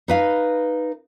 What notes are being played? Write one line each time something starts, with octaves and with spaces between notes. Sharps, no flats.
D#4 B4 F5